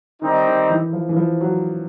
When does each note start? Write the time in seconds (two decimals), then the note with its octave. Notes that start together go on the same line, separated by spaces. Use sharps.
0.22 D#3 G3 C4 D#4
0.46 D#3
0.70 E3
0.93 F3
1.09 E3
1.16 F3
1.41 F#3